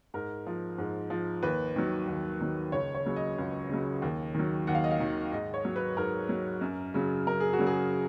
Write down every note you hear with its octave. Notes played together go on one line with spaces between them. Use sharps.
G#2 A#4
F3
G#2
F3
D#2 B4
D#3 F#3
D#2
D#3 F#3
C#2 C#5
C#5
C#3 F#3
D#5
C#2
C#3 F#3
D#2
D#3 F#3
D#2 F#5
F5
D#5
F5
D#3 F#3
G#2 D#5
C#5
F#3
B4
G#2 A#4
F#3
F#2
C#3 F#3
F#2 A#4
G#4
F#4
C#3 F#3
G#4